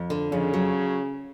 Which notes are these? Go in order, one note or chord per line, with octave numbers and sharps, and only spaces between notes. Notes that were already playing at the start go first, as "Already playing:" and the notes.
Already playing: F2
D3
F2 C#3
F#3